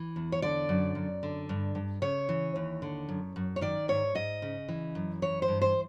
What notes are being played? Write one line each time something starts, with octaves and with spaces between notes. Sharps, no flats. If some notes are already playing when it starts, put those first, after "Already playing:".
Already playing: E3
E2
C#5
D3 D5
F#2
F#2
D3
G2
G2
C#3 C#5
E3
D#2
D3
F#2
F#2
C#5
D#3 D5
G#2 C#5
G#2 D#5
C#3
E3
F#2
E3 C#5
C5
G2
C5